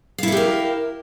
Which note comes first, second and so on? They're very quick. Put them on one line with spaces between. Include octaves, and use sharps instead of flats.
F5 E4 A4 G4 A#4